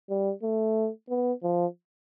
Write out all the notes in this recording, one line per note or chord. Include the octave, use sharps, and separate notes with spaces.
G3
A3
B3
F3